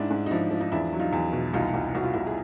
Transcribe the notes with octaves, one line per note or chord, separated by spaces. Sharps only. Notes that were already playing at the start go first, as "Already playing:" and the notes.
Already playing: G#2 D4 E4
G#2
D#4
F3 D4 E4
F3
D#4
E2 D4 E4
F#3
D#4 F4
E2
B2
C2 D#4 F4
C2
C2 F#4
F4
C2 E4 F#4
G#4